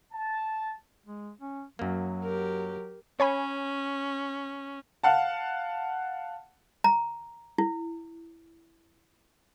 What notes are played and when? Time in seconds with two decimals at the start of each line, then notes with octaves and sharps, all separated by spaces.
0.13 A5
1.06 G#3
1.41 C#4
1.79 F#2 F#3 A#3
2.23 G4 A#4
3.20 C#4 C#5 G#5 B5
5.03 F5 F#5 A5
6.84 A#5
7.58 E4